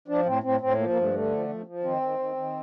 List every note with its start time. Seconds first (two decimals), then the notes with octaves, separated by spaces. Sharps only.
0.08 F3 D4
0.26 A2 C4
0.43 A2 C4
0.61 A2 C4
0.78 F3 A#3
0.90 A#3
0.96 G2
1.01 A3
1.13 D3 A3
1.31 F3
1.48 F3
1.66 F3
1.83 D#3 C4
2.01 D#3
2.19 D#3
2.36 D#3